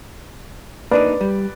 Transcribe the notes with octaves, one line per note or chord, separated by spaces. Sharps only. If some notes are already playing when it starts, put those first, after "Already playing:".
A#3 D4 D#4 B4 D5
G3